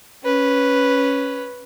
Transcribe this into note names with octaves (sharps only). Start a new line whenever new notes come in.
C#4 B4